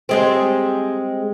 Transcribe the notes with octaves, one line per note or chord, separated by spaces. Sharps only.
G3 G#3 C4